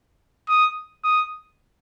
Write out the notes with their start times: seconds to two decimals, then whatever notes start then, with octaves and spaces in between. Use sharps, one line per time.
0.48 D#6
1.04 D#6